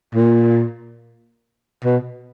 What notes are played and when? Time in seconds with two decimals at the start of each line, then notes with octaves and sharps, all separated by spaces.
0.15 A#2
1.84 B2